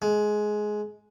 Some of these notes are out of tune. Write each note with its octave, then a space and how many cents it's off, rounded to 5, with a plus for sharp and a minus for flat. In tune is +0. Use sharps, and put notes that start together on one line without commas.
G#3 +15